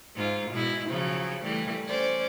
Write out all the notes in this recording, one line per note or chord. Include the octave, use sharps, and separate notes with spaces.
G#2 F4
B2 G#3 E4
C#3 F3 F#3
E3 G3 A3
C#4 C5 D5